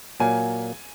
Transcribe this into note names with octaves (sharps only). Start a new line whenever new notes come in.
A#2 F#3 A#3 G#5